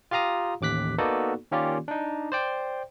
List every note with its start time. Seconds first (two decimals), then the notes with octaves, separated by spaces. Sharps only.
0.11 F4 G4 F5 A#5 D#6
0.61 A1 D#2 D6 F#6 B6
0.98 A#3 B3 D#4 F#4 A4 D5
1.52 D#3 A#3 C#4 F4 G4 D5
1.88 D4 D#4
2.32 C5 D5 G5